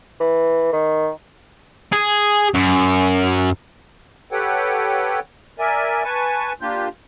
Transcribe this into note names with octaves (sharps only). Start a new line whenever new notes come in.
E3
D#3
G#4
F#2
G4 A4 B4 C#5 F#5 G5
A#4 D5 E5 G#5
B4 G#5 A5 C#6
A#3 D4 F4 G4 G6